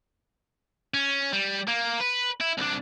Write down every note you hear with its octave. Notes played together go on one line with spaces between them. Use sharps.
C#4
G3
A#3
B4
E4
C2 D4